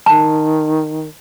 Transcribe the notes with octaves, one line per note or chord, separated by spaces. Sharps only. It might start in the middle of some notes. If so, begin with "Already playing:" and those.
D#3 A5